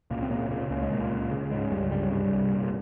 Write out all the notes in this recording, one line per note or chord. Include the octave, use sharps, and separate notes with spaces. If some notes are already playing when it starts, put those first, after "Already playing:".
C#2 A#2 A#3
C4
A#2 C#3 A#3
A#2 C#3 A#3
C#2 A#3
G#3
C#2 A#2 A#3
C#2
C#3
G#2 C#3 G#3
C#2 G2 G3
G2 C#3 G3
C2 G2 G3
C2
A#2